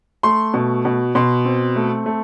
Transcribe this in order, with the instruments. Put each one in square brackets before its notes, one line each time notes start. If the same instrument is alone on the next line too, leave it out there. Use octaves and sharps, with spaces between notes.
[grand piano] A3 C6
B2
B2
B2 C6
C4
A3
A3